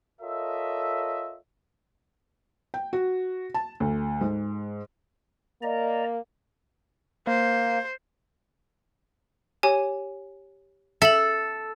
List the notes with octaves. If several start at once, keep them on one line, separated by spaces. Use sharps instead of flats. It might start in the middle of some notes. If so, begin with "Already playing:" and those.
F4 A4 A#4 C#5 D#5 E5
G5
F#4
A5
D2
G#2
A#3 D5 D#5 A#5
A#3 C5
G4 C#5 G#5
A4 E5 F#7